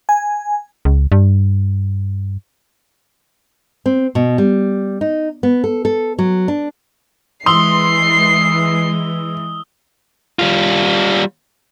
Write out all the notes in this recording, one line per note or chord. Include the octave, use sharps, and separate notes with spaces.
G#5
C#2
G2
C4
B2
G3
D#4
B3
A4
A4
F#3
D4
E3 G#3 C6 D#6 E6 C7 G7
G3 F4